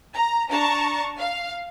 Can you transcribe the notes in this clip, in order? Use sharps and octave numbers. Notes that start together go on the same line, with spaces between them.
A#5
D4 A5 A#5 C#6
F5